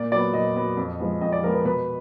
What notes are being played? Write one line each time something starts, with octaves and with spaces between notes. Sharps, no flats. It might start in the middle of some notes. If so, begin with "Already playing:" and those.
Already playing: A#2 D5
F#3 B3 D5
A#2 D#5
F#3 B3
F2
F3 G#3 B3
F2 D#5
D5
F3 G#3 B3 A#4
B4
B2 B4